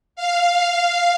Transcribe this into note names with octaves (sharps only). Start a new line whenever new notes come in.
F5